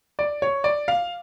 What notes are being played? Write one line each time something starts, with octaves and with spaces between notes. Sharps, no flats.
D5
C#5
D5
F5